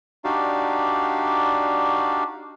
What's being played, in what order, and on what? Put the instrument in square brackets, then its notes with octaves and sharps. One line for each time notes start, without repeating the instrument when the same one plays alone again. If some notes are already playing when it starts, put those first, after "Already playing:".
[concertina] D4 D#4 F#4 G4 D5 F5